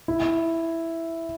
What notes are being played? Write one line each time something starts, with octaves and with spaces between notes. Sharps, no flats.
E4